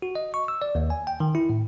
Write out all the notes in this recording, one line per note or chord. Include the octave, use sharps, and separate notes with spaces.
F#4
D#5
C#6
E6
D5
D#2
G#5
G5
D#3
E4
A2